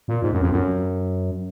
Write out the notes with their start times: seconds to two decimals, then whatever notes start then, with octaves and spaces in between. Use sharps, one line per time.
0.08 A#2
0.22 G#2
0.33 F#2
0.42 F2
0.52 F#2